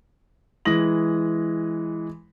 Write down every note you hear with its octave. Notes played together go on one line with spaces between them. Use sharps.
E3 G#3 D#6 A#6 F#7